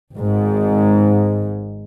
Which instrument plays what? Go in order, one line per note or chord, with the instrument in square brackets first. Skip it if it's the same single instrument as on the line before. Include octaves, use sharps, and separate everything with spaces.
[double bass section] G#1 G#2